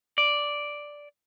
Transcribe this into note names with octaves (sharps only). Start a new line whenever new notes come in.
D5